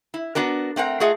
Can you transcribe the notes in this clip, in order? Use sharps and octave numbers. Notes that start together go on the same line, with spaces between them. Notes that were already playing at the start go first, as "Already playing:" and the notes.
E4
B3 D4 F#4 A#4
A3 C4 A#4 F#5
A3 F4 G#4 D#5 F#5